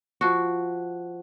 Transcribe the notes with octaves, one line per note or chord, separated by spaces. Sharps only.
F3 F#4